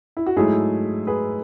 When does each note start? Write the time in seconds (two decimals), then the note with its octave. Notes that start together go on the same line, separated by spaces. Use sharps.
0.17 E4
0.26 F#4
0.36 G#2 F#3 A3 E4 G#4
1.07 G#4 B4